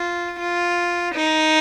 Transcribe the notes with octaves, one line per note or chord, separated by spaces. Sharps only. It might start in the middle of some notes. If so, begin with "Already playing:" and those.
Already playing: F4
F4
D#4